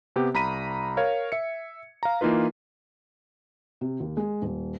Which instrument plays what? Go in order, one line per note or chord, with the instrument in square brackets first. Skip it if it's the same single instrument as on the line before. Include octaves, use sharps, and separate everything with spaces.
[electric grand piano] C3 B3 G4
C2 A#5 B5 B6 D#7
A#4 C#5 F5 G#6
E5 C#7
F5 A#5
E3 A#3 D#4 F4 B4
[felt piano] C3
D#2
G#3
D#1